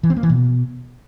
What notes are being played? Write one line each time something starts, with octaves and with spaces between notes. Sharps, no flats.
E3
C4
A#3
E3
B2